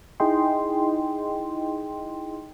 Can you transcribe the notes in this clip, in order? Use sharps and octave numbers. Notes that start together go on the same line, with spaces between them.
D#4 E4 G#4 D#5 G5 C6